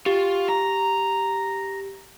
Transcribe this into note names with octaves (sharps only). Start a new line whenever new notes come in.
F4 G4
A#5